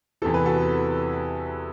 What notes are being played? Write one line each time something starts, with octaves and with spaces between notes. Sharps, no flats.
E2 C3 E3 A4
B4
F#4 A4